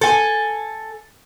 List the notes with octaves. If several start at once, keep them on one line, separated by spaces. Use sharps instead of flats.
A4 G#5